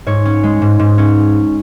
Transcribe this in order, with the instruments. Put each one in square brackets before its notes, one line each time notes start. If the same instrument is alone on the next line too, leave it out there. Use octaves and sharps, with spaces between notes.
[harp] G#2 C#5
C#4
G#3
G#2
G#2
C#4